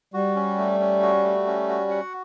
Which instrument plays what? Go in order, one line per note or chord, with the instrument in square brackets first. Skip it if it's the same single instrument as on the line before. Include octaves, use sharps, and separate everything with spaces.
[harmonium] G3 [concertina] F#4
[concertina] C#4
A3
C#4
F#4
A3
C#4
F#4
F#5